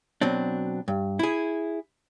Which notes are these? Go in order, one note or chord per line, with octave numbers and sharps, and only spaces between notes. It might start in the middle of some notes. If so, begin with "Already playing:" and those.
B2 F#3 C4 D4
G2
E4 G#4